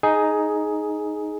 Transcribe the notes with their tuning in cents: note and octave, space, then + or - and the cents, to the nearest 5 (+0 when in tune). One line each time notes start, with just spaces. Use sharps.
D#4 +0 G#4 +10